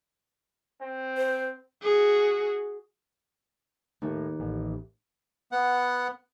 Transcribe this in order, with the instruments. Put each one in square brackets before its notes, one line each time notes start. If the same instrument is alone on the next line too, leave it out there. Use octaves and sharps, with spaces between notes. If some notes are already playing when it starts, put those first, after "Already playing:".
[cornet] C4
[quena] C5
[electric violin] F#4 G#4
[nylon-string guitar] D#2 [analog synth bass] A2
[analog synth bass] A1
[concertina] B3 F#5